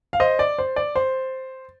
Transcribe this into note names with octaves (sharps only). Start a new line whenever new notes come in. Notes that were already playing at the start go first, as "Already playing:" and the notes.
F5
C5 D#5
D5
C5
D5
C5